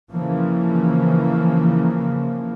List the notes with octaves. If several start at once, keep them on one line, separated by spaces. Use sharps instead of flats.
C#3 E3 F3 A#3